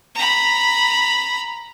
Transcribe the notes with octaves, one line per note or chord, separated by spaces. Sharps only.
A#5 B5